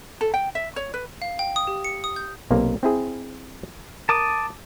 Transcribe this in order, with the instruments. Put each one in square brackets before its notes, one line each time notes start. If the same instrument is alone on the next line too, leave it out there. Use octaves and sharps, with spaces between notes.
[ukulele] A4
G5
E5
C#5
B4
[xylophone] F5
G5
D#6
G4
C#7
D#6
G6
[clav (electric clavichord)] B1 C3 A#3
C4 E4 G#4
[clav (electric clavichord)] A#4 [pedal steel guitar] A5 D6 D#6